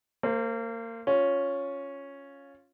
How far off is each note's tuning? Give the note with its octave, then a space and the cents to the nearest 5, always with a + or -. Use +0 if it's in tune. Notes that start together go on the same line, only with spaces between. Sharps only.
A#3 -30 C5 +5
C#4 +0 F4 +15